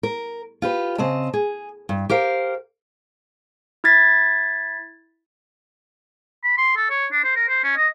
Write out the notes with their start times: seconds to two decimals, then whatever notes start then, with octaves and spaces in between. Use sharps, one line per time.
0.03 A#4
0.62 F4 G4 B4
0.98 C#3 C4 D#5 A5
1.33 G#4
1.89 G2
2.09 G4 A#4 C5 F5
3.84 E4 G#6 A6 B6
6.44 B5
6.58 C6
6.76 A4
6.90 C#5
7.12 D4
7.24 C5
7.36 A#4
7.49 C5
7.64 C#4
7.77 D#5